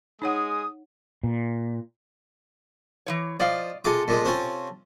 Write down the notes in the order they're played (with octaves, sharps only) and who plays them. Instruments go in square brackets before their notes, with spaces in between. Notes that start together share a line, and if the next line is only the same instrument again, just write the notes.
[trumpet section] G#3 G#4 D#6 [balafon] D#4 C#5 F#5
[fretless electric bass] A#2
[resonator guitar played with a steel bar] E3 F3 C#5
[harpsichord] F3 [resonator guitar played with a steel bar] D5 D#5 F5
[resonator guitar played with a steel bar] C3 A4 [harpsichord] G#3 F4 D6
[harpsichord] A#2 F3 G#3
C4 C#4 F4